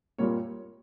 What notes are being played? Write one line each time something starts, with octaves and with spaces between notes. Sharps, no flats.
A#2 G3 A#3 C#5